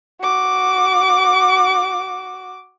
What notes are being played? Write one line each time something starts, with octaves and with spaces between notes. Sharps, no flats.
F#4 D6